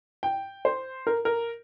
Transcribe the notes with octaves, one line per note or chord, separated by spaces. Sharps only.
G5
C5
A#4
A#4